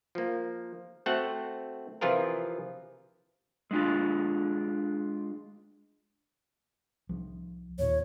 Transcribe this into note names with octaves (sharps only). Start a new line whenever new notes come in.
F3 A#3
A3 C4 F#4 F#5
C3 E3 F3 F4 G#4 A#4
G#3 D4 F4
C2 F3
D#2 A#2 C#5